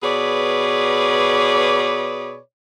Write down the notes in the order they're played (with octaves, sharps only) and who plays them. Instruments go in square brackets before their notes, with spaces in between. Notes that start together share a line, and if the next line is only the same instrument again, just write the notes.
[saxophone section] B2 G#4 B4 C#5 D5